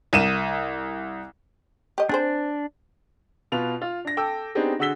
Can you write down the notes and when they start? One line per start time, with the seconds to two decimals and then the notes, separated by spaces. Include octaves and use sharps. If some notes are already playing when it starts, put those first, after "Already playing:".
0.13 C2 D#7 E7
1.98 G4 D#5
2.09 C4 D4 G#4 C5
3.52 B2 F4 B4 F7
3.82 F4
4.05 D4 A#6
4.17 A4 G5 A5 D6 E6
4.55 B3 C4 D4 D#4 G4 G#4
4.79 D3 F#4 G#4 E6 B6 G7